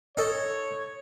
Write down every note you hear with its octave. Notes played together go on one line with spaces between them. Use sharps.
D#4 A4 C#5